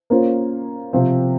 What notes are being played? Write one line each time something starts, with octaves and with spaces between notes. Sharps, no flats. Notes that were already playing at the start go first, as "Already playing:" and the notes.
A#3 C#4 F4 C5
C3 F3 C4 F4 C5